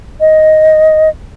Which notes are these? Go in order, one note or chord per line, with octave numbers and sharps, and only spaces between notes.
D#5